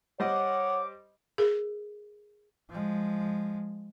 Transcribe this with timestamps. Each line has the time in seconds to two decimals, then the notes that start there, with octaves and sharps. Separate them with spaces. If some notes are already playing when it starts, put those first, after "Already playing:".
0.20 G3 C5 C#5 D#5 F#5 D6
1.38 G#4 A#4
2.70 F3 G#3